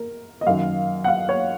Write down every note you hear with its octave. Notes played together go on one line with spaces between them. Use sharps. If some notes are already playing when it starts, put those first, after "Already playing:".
Already playing: A#4
D#5
F#2 D#3 F5
F#5
F5
C#5